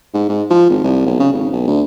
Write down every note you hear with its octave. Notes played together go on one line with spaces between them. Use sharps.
G#2
G#2
F3
G#1
C2
B1
C#3
G#1
B1
D2